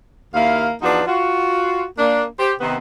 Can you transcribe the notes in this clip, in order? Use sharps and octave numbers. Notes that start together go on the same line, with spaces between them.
D#2 A#3 E4 F5
E2 F3 D4 D#4 F#4 B4
F4 F#4
A#3 D4
G4 C5
C3 D#3 B3